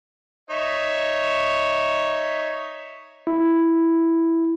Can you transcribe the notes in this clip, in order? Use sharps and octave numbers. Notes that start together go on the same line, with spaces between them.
D#4 C#5 E5
E4